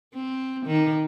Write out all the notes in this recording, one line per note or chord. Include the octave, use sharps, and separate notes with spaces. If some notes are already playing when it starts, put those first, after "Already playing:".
C4
D#3